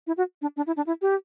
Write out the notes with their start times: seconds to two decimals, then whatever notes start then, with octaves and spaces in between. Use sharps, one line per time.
0.07 E4
0.17 F#4
0.42 D4
0.56 D4
0.67 E4
0.77 D4
0.86 E4
1.02 G4